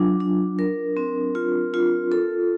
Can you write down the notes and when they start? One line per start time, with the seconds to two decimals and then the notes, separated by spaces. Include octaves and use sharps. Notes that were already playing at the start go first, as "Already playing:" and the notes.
Already playing: F#3 D4 F4
0.20 D4
0.59 A#4
0.97 C4
1.35 F4
1.74 F4
2.12 A4